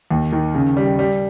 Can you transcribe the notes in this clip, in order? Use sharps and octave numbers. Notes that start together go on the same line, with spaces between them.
D#2
D#3
C#3
G3
G3